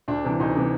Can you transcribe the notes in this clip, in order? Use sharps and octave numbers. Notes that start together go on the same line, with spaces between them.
D2 D4
C3 E3
D2 D#4
C3 E3